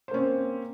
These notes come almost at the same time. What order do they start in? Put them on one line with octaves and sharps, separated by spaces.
C5 A#3 C#4 C4